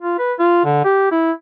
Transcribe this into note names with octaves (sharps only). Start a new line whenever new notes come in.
F4
B4
F4
D3
G4
E4